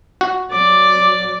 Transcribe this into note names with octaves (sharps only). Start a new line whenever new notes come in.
F#4
F#3 D5 D6